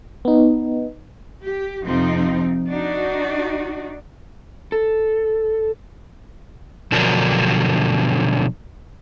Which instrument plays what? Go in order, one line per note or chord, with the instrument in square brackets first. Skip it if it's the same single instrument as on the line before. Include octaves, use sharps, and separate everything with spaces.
[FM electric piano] B3 D#4
[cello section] G4
F2 C3 F3 C4 D#4
D4 D#4 F#4
[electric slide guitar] A4
B2 D3 F3 F#3 D4 A#4